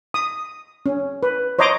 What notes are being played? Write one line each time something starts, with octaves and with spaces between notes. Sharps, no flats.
D#6
C#4
B4
C5 C#5 D#5 A#5 C6 D6